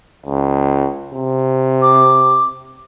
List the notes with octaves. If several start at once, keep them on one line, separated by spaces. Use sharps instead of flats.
C#2
C3
D6